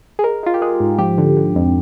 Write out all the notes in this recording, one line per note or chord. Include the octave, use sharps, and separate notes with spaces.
G#4
G#3 A#4
G#3 F4
G4
G#3 G#4
G#2
F3 G4
D3
D3
F2